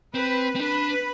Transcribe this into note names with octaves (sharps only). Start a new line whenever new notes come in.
C4 B4
C4
D4 B4